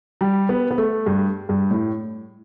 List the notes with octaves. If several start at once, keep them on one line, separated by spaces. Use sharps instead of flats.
G3
B3
B3
A3
G2
G2
A2